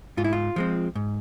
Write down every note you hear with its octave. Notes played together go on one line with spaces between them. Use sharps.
G#2 F4
E4
F4
F3 G#3 C4
G#2